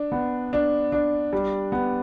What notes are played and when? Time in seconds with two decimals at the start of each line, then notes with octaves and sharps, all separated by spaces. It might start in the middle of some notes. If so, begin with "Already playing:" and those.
Already playing: D4
0.12 B3
0.53 D4
0.92 D4
1.33 G3
1.72 B3